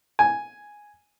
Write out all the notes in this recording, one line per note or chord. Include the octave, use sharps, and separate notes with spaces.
G#5